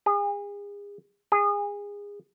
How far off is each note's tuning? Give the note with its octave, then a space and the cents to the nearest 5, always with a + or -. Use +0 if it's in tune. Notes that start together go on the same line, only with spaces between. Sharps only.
G#4 -35
G#4 -25